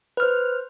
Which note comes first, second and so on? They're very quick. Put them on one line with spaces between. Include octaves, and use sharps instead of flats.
B4 F6 C5